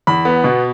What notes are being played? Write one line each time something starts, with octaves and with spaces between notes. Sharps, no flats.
E2 B5
B3
B2